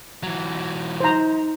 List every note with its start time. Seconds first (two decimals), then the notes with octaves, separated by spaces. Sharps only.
0.23 E3 F#3
1.00 D#4 C5 A#5